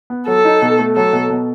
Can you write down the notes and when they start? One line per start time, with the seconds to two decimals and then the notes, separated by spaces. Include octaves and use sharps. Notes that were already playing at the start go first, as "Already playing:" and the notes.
0.10 B3
0.28 F#3 A4
0.45 D#4
0.62 B2
0.79 A3
0.96 F#3 A4
1.13 B2
1.30 B2